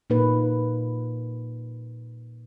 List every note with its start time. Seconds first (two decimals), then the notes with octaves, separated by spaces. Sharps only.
0.10 A#2 A#3 D#4 B4